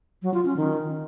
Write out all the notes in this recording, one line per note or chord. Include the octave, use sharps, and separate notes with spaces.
F#3
F4
C#4
D#3